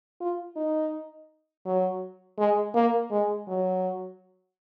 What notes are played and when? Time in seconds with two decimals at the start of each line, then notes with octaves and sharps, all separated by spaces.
0.21 F4
0.56 D#4
1.65 F#3
2.38 G#3
2.75 A#3
3.11 G#3
3.48 F#3